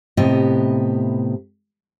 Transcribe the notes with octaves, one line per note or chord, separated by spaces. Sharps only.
A2 C3 B3 G4 D#5